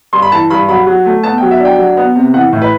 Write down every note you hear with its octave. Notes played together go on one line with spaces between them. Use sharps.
G2 C6
B5
E3 A5
G2 B5
F#3 B5
F#3
A3
B3 A5
G5
F#3
E5
D4 G5
F#3
B3
C3
E3 F#5
A2
B4